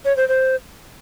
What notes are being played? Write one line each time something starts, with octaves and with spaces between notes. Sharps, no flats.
C#5
C5
C5